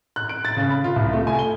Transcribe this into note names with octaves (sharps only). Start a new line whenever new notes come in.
F#6
D7
A6
C#3
B5
F4
C2
A3
G#5
G7